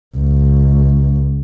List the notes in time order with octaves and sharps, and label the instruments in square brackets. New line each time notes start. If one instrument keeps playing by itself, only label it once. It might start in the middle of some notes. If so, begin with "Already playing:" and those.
[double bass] C#2